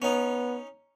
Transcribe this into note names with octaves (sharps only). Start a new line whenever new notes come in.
B3 C#4 D#4